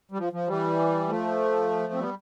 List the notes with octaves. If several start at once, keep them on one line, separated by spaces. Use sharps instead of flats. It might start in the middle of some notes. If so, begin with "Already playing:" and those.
G3
F3
F3
E3 G3
F3 A3
C4
G3 B3